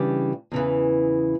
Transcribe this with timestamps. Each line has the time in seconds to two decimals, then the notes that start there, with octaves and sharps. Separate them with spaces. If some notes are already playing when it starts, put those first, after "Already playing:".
Already playing: C#3 E3 G3 D4 G4
0.52 E2 C#3 E3